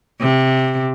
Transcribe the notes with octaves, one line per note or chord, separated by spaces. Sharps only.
C3